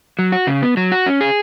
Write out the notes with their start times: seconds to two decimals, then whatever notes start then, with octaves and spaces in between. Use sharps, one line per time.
0.19 F#3
0.32 F#4
0.47 C#3
0.62 B3
0.77 F#3
0.92 F#4
1.06 C#4
1.21 G#4